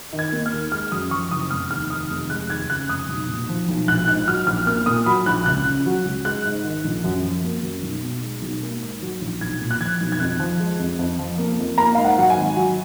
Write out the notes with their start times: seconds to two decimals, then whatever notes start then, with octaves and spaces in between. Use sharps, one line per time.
0.13 D#3
0.19 G#6
0.32 A#3
0.46 F6
0.52 D#2
0.72 G#3 F6
0.92 F#2 D#6
1.11 F3 C#6
1.31 F#1 D#6
1.50 F1 F6
1.71 D#2 F6
1.90 D#3 D#6
2.10 F1
2.30 G#3 F#6
2.50 D#2 G#6
2.69 C#3 F#6
2.89 F1 D#6
3.09 B1
3.28 A#2
3.49 F3
3.68 B1
3.88 A#1 F#6
4.08 G#2 F#6
4.28 F#3 F6
4.47 A#1 F6
4.66 A#3 F6
4.86 A#2 D#6
5.06 F#3 B5
5.26 A#1 F#6
5.46 C#2 F#6
5.66 C#3
5.86 F#3
6.05 C#2
6.25 G#3 F#6
6.45 G#2
6.64 D#3
6.84 A#1
7.04 F#2
7.24 F3
7.43 A#3
7.63 F#2
7.83 B1
8.03 B2
8.23 G#3
8.42 B1
8.62 A#3
8.81 G#2
9.02 F#3
9.21 A#1
9.41 B1 G#6
9.61 A#2
9.71 F#6
9.80 F3 G#6
10.01 B1
10.12 G#6
10.20 F2 F#6
10.39 F3
10.60 G#3
10.79 F2
10.99 F2
11.19 F3
11.38 A#3
11.58 F2
11.78 A#3 A#5
11.95 G#2 F5
12.04 F#5
12.18 F#3 F#5
12.30 G#5
12.37 G#1
12.56 F#3